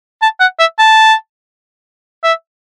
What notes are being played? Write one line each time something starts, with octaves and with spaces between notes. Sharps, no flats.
A5
F#5
E5
A5
E5